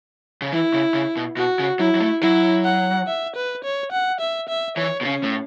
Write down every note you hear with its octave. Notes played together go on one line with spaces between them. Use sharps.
C#3
E3 E4
C#3
C#3
B2
B2 F#4
C#3
F#3 E4
F#3
A3
F#3 E4
F#5
E5
B4
C#5
F#5
E5
E5
E3 C#5
B2
C#3 C#4
A2